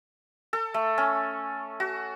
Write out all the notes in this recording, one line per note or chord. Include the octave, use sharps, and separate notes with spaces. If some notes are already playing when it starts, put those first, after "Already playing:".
A4
A3
C#4
F#4